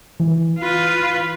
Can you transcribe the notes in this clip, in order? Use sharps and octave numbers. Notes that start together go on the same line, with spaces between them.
E3
F4 B4